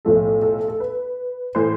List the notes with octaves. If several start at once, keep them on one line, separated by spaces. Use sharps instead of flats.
B1 A2 F3 A3 A4
A4
A4
B4
A2 E3 A3 C5